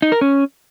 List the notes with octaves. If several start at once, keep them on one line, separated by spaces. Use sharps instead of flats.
D#4
A#4
C#4